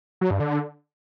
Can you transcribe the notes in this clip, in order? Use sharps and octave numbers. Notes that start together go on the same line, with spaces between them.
F#3
G2
D3